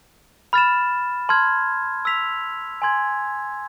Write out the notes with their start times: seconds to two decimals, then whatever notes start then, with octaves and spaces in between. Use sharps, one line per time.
0.53 B5 F6 A6 E7
1.29 A5 C6 F6 G#6
2.05 E6 B6 F7
2.82 G#5 C6 G#6